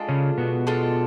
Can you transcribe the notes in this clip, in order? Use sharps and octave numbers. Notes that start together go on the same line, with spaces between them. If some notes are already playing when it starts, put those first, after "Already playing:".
Already playing: G#3 D4 F4 A4
C#3 C#4
B2 B3
G#3 D4 F4 A4